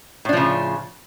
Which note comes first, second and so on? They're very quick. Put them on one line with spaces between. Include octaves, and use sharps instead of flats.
A2 D4 F3 C#3